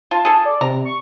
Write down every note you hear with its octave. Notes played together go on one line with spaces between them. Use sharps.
F4 A5
G#4 A4
D5
C3 A#5
C#6